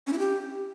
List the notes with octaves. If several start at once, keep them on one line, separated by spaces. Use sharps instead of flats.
C#4
E4
G4